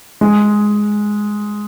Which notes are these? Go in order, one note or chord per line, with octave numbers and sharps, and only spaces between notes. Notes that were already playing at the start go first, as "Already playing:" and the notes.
G#3